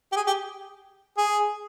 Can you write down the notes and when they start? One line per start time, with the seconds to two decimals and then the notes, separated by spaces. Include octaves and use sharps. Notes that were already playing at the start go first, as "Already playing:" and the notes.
0.12 G4
0.16 G#4
0.27 G4
1.17 G#4